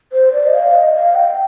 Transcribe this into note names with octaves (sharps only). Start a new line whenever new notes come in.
C5
D5
D#5
F5
D#5
F5
G5